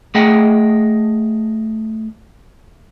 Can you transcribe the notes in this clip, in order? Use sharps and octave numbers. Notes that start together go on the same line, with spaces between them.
A3 G#4 D#5 F#5 G5